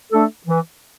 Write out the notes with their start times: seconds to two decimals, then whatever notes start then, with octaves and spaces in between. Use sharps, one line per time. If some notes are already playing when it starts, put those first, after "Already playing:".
0.12 A3 D4 A4
0.47 E3